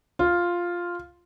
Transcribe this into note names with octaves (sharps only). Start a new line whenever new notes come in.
F4